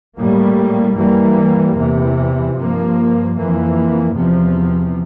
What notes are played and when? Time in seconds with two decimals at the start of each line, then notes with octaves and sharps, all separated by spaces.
0.17 A2 G3 A#3
0.97 G2 E3 G3 A#3
1.77 E2 C3 E3
2.56 G2 F3 A#3
3.36 F2 E3 A#3
4.16 E2 C3 F3